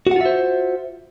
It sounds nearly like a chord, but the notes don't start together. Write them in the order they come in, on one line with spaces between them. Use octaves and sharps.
F#4 F#5 F4 E5 C5